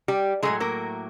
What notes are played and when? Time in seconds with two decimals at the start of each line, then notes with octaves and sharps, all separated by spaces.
0.08 G3 G4
0.43 A2 F#3 G#3 A3 G#4
0.60 A#3 A#4